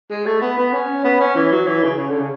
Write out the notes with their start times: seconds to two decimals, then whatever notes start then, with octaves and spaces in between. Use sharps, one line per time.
0.10 G#3
0.26 A3
0.41 B3
0.57 B3
0.73 C#4
1.04 B3
1.20 C#4
1.35 E3
1.52 F#3
1.67 E3
1.83 C#3
1.98 C#3
2.09 D3
2.20 C#3